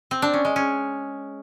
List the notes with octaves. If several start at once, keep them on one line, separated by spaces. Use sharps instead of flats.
C4
D4
C#4
G#3
C#4